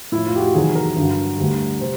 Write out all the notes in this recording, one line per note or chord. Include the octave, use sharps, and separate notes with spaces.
A2 F3 E4
F4
G4
F#4
E2 C3 D#3 F#3 G#4
A#4
G2 D3 F#3
D2 D3 G3
C3 C5